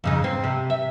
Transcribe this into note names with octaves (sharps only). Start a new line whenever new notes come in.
F2 C#3 D#4
C4
C3
E5